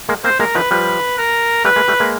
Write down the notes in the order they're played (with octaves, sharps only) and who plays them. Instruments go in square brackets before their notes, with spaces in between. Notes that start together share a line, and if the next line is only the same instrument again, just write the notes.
[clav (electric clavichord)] G#3 A#3
[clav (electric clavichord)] A#3 C4 [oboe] C5
[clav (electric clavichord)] G#3 A#3 [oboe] A#4
[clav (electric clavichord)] D#3 F3 [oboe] B4
[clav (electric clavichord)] F3 G3 [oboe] B4
[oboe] A#4
[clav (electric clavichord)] G3 A3 [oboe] B4
[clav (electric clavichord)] G#3 A#3
G3 A3
G#3 A#3